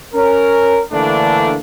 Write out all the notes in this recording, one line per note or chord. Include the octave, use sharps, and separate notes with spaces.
C#4 A#4
D3 E3 A3 A#3 D4